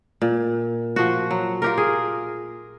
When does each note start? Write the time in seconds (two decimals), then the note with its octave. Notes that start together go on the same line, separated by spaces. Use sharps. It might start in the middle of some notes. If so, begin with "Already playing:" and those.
0.22 A#2
0.96 F3 F#4
1.31 F#3
1.62 F4 G4 A#4
1.78 G#4